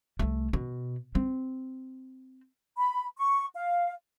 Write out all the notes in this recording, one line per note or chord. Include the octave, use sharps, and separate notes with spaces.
C2 A3
B2
C4
B5
C#6
F5